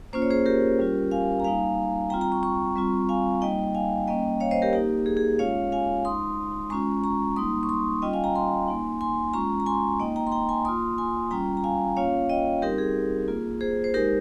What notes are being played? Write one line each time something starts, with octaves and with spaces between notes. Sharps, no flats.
A#3 C#4 F4 C5
C#5
G#4 C5
G4 A#4
G3 C#4 F4
F5 G#5
A#5
G3 A#3 D#4 F5 G#5
G3 C4 F4 G5 A#5
G5 A#5
A#5 C#6
A#5 C#6
G3 C4 F4
F5 G#5
G3 A#3 D#4 D#5 G5
F5 G#5
G3 A#3 C#4 D#5 G5
C#5 F5
C5 D#5
G4 A#4
A#3 D#4 G4
G#4
G#4
G#3 C#4 F4 C#5 F5
F5 G#5
G#3 D#4 C6 D#6
G#3 C#4 F4 A#5 C#6
A#5 C#6
G3 A#3 D#4 C6 D#6
C#6
C6 D#6
G3 C#4 F4 D#5 G5
F5 G#5
G5 A#5
G#5 C6
A#3 D#4
G#5 C6
G#3 C#4 F4 A#5 C#6
A#5
G#5 C6
A#3 D#4 D#5 G5
G5 A#5
C6
G5 A#5
G#5 C6
A#3 F4 C6 D#6
G#5 C6
G3 C#4 F4 G5 A#5
A#5
F5 G#5
A#3 C#4 F4 C#5 F5
D#5 G5
G3 C4 D#4 G4 A#4
G#4
A#3 F4
G#4 C5
C5
G#3 D#4 G4 A#4